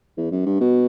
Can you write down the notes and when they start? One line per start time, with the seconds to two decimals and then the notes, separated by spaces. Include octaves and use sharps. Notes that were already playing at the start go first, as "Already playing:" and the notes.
0.17 E2
0.31 F#2
0.46 G2
0.60 B2